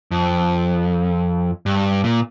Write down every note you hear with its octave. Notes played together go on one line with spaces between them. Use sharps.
F2
G2
A#2